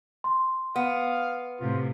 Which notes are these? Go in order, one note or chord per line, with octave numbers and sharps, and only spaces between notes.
C6
B3 F5
A2 C3 F4